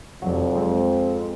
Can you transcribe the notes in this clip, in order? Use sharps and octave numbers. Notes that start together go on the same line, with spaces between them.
F1 F2 F#3
G#3 C4